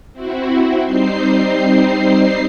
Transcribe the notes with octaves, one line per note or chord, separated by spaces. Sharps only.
C4 E4 F#4
G3 C4 D#4 C5 C7